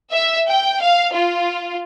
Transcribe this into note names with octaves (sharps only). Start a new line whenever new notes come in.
E5
G5
F5
F4